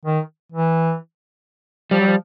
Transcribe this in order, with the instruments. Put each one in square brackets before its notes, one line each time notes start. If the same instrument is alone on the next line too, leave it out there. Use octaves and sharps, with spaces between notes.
[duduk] D#3
E3
[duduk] F3 [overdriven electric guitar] G3
[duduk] F#3
F3